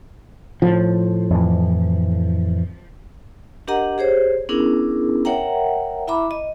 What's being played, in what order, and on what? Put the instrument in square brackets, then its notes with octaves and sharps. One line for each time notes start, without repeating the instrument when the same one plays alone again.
[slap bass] A2 [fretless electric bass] F3
[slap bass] F2 A2 E3
[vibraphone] D4 G4 A#4 D#5 F#5 A#5
G4 G#4 C5 C#5
B3 C#4 D4 E4 G#4 A#4
A#4 C#5 E5 F#5 G5 A#5
E4 E5 A#5 B5 D6
D#5